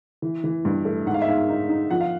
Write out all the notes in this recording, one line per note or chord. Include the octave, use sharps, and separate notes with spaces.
E3
E3
G2
A3
G#2 F#5
F5
E5
G#2 F5
D#4
D#4
F3 F#5
F5